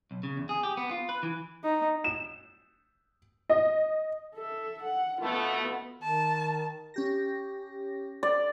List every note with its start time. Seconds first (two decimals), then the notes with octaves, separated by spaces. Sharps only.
0.11 B1
0.23 C#3
0.37 E2
0.49 G#4
0.63 G4
0.77 B3
0.91 F4
1.09 B4
1.23 E3
1.64 D#4
2.04 E7
3.49 D#5
4.35 A4 E5
4.83 F#5
5.21 B2 A3 B3 F4
6.02 D#3 A5
6.94 C#4 G4 A#6
8.23 D5